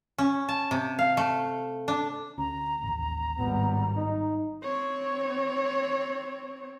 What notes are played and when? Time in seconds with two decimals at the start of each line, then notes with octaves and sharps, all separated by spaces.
0.18 C#4
0.49 A5
0.71 C3
0.99 F5
1.17 A3
1.88 D4
2.38 D2 C#4 A#5
2.83 A1 D#2
3.39 G#1 A2 G3 B3
3.97 D#4
4.63 C4 C#5